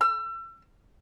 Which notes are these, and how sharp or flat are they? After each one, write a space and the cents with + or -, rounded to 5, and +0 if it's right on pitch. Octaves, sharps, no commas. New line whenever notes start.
E6 +35